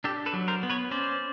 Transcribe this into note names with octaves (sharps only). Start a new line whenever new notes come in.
D4 G4 A4
A4 B4
F#3
A#4 C5
B3
B4 C#5
C#4 C5 D5